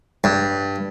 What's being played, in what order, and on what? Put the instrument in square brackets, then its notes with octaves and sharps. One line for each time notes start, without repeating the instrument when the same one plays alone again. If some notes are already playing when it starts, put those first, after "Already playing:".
[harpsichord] G2